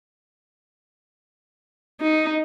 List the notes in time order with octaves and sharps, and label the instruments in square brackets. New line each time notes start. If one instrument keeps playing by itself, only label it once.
[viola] D#4